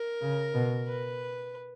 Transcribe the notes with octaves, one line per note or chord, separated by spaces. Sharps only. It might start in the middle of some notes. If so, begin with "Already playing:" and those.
Already playing: A#4
C#3
B2
B4